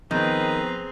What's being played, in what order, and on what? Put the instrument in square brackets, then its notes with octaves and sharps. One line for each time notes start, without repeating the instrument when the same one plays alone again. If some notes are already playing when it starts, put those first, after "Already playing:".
[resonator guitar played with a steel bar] D#3 [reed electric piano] F3 B3 [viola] C4 G#4 [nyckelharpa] B4 A#5